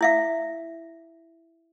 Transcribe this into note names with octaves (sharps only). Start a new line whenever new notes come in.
E4 E5 F5